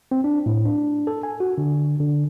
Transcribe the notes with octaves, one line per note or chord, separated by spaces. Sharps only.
C4
D4
A2
D4
A4
G#5
F#4
D3
D3